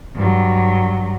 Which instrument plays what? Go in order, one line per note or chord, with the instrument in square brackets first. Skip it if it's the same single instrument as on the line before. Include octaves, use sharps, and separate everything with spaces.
[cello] G2 F#3